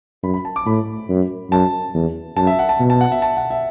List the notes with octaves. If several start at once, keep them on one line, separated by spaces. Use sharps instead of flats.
F#2 B5
B5
A5
D6
A2 B5
F#2
F#2 A5
E2
F#2 A5
E5
F#5
A5
B2
A5
F#5
E5
A5
F#5
E5